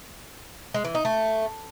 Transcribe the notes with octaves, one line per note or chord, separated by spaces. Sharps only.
G#3
E3
D#4
A3